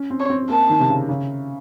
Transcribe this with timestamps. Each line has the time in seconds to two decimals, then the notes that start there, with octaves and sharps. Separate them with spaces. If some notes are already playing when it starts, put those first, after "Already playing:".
Already playing: C#4
0.10 C4
0.20 C#5
0.30 C4
0.50 A#3 A5
0.69 D#3
0.80 C3
0.89 C#3
1.09 C#3